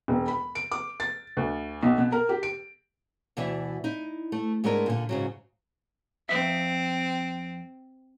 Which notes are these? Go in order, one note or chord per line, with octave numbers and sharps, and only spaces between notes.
E1
B5
D7
D6
A6
D2
B1
B2
A#4
G4
D7
D2 B2 E3 D5 E5
D#4 E4
A3
G#2 G#3 A3 B3 D4 A#4
A#2 D3
G#2 C#3 F#3
F2 C4 E5